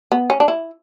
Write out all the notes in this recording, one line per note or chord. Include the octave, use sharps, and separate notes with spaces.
B3
C#4
D4
E4